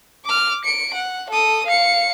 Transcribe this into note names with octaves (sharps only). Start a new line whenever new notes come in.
D6 F6
C#7 D7
F#5
A4 D#6
F5 C#7